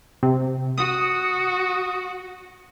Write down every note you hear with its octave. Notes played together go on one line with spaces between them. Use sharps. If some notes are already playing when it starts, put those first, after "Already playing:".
C3
F#4 D#6